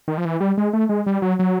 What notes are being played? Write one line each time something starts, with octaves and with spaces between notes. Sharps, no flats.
D#3
F3
E3
G3
G#3
A3
G#3
G3
F#3
F#3